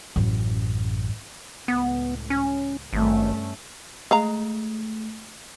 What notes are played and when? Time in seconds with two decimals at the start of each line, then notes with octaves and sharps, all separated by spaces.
0.16 A1 F#2
1.68 C#2 A2 B3
2.30 C#4
2.93 G#1 G2 A3 C#4
4.11 G#3 A3 F5 A#5